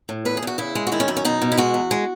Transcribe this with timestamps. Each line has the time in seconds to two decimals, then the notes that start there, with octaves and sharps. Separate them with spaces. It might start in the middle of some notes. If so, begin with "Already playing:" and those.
0.09 A2
0.25 E2 B4
0.37 G#4
0.42 E2 F#4
0.58 C#3 E4
0.75 G#3
0.87 F#4
0.92 D#3 E4
1.00 C#4
1.08 F#2 E4
1.17 C#4
1.25 B2 D#4
1.42 B2
1.52 E4
1.58 G#3 F#4
1.74 E2
1.91 G#3